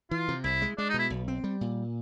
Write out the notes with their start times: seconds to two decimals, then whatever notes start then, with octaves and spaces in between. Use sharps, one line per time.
0.11 E3 F4
0.28 C3
0.44 C2 E4
0.62 G#3
0.78 G#3 D4
0.89 D#4
0.94 B2
0.99 E4
1.10 B1
1.28 C4
1.44 G3
1.61 A#2